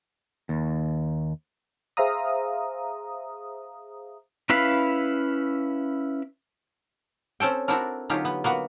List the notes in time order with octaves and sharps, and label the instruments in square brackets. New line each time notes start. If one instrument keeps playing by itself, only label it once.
[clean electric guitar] D#2
[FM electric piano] G#4 C5 E5 F5 A#5 D#6
[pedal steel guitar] C#4 E4 B4 F5 B5
[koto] C4 C#4 A4 G5
C4 D4 E4 F#4 A4 A#4
D3 F#3 C#4 D#4 F4 G4
B3
A#3 B3 F#4 B4